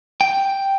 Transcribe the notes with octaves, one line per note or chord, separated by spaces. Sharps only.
G5